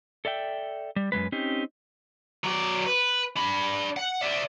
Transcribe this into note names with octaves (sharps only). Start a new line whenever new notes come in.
A4 D5 E5 G5
G3
F#2 B2 G#3 B4
C4 C#4 D#4 G4
F#3 D5
B4
D4 B5
F#5
D5 E5